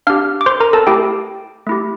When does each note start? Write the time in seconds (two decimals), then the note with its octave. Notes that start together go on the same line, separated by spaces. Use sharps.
0.07 D4 G4 F5 F6
0.41 D6
0.46 C5 C6
0.60 A#4 A#5
0.73 A4 A5
0.87 A3 E4 G4 A4 G5
1.67 A3 E4 G4